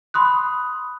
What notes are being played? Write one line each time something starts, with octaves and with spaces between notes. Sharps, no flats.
B5 C6 D#6 F#6